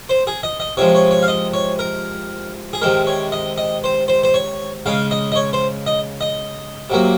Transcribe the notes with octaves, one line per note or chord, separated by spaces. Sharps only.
C5
G#4
D#5
D#5
C3 F3 G#3 C#5
C#5
C#5
F5
D#5
C#5
A#4
G#4
C3 D#3 G#3 A#4
C#5
D#5
D#5
C5
C5
C5
C#5
C#3 G#3 F5
D#5
D#5
C#5
C5
D#5
D#5
C3 F#3 A#3